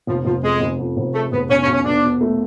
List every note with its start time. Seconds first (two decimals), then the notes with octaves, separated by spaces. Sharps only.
0.07 F1 F3
0.25 F1 F3
0.43 F2 G#3
0.60 F1
0.79 F2
0.97 F1
1.13 G#3 A3
1.32 F1 B3
1.49 B1 C#4
1.61 C#4
1.67 B1
1.73 C#4
1.85 B2 D4
2.03 B2
2.21 A3